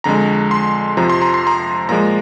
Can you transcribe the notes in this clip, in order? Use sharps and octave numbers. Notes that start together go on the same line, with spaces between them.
F2 D3 G#3 A#5
C6
F2 C3 F3 A#5
C6
A#5
C6
A#5
A#2 F3 G#3 A#5